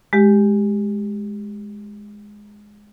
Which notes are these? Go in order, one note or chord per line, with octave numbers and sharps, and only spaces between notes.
G#3 G4